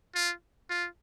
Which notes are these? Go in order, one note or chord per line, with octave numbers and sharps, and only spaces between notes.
F4
F4